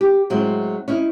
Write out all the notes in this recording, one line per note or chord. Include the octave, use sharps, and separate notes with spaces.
G4
A2 F#3 G#3 C4
C#4 D#4 E4